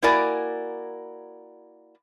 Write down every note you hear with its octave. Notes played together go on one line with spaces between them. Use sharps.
A#3 E4 F#4 A#4 D5 G#5